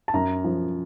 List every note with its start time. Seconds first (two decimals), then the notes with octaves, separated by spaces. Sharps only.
0.08 A5
0.14 F#2 A#5
0.44 F3